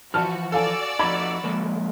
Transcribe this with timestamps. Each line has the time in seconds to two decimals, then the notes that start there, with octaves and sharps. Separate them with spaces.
0.14 E3 F3 F#4 A5 F6
0.52 F#4 A4 D5 F5 G#5 E6
0.99 F2 D#4 B5 G#6
1.44 F3 G#3 A#3